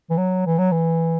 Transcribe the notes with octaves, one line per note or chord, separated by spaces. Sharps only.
E3
F#3
E3
F#3
E3